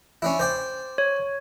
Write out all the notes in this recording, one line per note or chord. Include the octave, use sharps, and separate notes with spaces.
C#4 D4 E4
C5 D5 G5
C#5